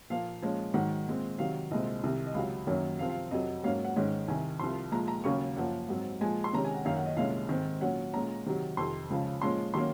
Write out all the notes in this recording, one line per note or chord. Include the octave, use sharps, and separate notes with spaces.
A#2 F3 A#3 F5
A#2 F3 G#3 C#4
G#2 D#3 F#3 F#5
A#2 G#3 C4
C3 D#3 F#3 F5
C2 A#2 G#3 C4 D#5
C2 C3 D#3
D#5
C#2 C3 F#3 F5
F#2 D#3 F#3 A#3 C#4
C3 F3 C4 F5
F5
F2 C3 F#3 D#5
G#2 F#3 A#3 C#4 F5
F#5
G#2 D#3 G#3 C#4
C2 C3 D#3 G#5
C2 C3 F3 C6
A#2 F3 G#3 A#5
A#5
D#2 C#3 F#3 A#3 C#4 C#6
F#2 F3 A#3 F#5
G#2 F#3 C4
A#2 F3 G#3 G#5
C6
C3 D#3 G#3 C#4 A#5
G#5
F#5
F#2 D#3 A#3 C#4 F5
F#5
D#5
C2 A#2 G#3 C#4 F5
G#2 D#3 G#3 C4
A#2 F#3 C#4 F#5
A#2 G#3 C#4 A#5
C3 D#3 F#3
F2 C3 D#3 C6
C#2 C#3 F3
A#2 F3 G#3 C#4 C6
D#3 F#3 A#3 C#4 C6